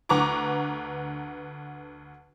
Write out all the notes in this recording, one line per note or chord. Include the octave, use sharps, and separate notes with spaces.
D2 D3 B4 A#5 C#6 D6